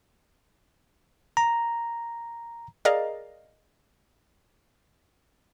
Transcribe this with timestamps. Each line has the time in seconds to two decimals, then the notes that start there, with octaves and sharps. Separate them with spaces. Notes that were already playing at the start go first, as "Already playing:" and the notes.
1.37 A#5
2.85 G#4 A#4 D5 D#5 F5 A#5